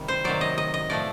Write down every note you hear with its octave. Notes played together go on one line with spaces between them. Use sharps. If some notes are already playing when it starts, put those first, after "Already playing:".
Already playing: C3 D#3 G3
C5
C3 D#3 F#3 D5
D#5
D#5
D#5
A2 F3 A3 D5